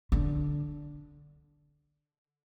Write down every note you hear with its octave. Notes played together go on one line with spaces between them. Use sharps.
D3